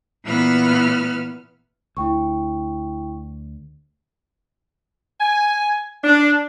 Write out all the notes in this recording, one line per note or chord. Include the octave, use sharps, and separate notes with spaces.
A#2 E3 B3 B4 E6 F6
D2 E4 G5 C#6
G#5
D4